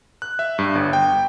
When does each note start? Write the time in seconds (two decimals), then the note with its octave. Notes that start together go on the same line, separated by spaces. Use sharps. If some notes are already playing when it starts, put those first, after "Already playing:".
0.22 F#6
0.39 E5
0.59 G2
0.75 G1
0.93 G5